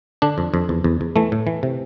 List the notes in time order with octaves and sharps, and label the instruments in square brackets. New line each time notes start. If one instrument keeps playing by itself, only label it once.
[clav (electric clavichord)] D3 D4
F2
F2
E2
E2
E2
E3 A3
A2
E3
C3